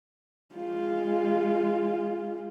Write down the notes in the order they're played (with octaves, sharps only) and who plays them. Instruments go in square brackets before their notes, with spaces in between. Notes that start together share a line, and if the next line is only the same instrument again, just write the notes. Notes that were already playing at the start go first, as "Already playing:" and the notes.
[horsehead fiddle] G#3 F4